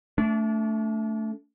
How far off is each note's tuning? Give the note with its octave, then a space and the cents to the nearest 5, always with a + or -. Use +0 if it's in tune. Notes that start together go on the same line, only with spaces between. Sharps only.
A3 +0 D4 -35